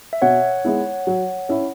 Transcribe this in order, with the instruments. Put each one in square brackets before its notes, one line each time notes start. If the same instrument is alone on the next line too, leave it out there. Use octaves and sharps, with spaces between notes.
[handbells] E5
[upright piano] B2 [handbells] C#5 F#5
[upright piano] G#3 B3 E4
F#3
C#4 E4